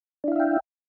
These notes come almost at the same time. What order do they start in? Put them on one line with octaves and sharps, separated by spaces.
D4 E4 F5 E5 G5